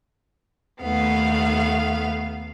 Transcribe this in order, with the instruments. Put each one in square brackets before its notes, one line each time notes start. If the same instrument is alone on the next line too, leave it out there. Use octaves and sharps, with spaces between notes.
[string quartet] D#2 A3 B3 F5